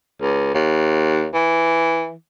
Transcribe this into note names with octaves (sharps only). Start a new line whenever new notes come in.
C#2
D#2
E3